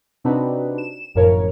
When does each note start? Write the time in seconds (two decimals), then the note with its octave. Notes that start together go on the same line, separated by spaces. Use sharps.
0.24 C3 C4 D4 D#4 F#4 B4
0.78 E7
1.14 G1 F#2 A2 F3 A#4 C#5